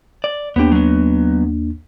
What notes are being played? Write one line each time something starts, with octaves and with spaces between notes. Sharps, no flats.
D5
D#2 A#3 B3 D4 G4
F#3 B3